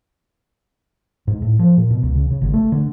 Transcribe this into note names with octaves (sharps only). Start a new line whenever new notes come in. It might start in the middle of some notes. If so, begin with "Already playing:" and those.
G#2
A2
F3
A#2
B2
C#2
C#3
C#3
G#1
A3
D3